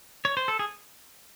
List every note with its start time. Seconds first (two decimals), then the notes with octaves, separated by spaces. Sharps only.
0.25 C#5
0.37 C5
0.48 A4
0.59 G#4